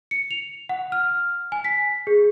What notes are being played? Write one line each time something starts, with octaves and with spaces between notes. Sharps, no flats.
C#7
F7
F#5
F6
G#5
B6
G#4